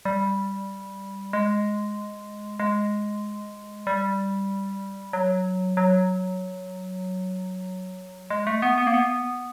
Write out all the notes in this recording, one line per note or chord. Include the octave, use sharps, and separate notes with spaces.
G3
G#3
G#3
G3
F#3
F#3
G#3
A3
B3
B3
A#3
B3